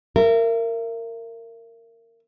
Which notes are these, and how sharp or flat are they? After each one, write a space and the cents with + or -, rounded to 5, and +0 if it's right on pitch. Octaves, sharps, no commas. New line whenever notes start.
A#4 -20 E5 +35